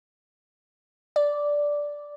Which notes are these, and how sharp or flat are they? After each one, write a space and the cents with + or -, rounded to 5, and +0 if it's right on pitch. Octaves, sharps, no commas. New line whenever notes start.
D5 -5